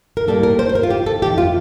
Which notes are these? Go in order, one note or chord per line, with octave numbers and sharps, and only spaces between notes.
A#4
A2 G3 A#3 A4
A#4
C5
C5
A#4
F4
G4
A4
F2 E3 A3 G4
F4